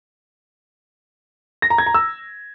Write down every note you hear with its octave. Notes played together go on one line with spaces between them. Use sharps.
A#6
A#5
G#6
A#5
E6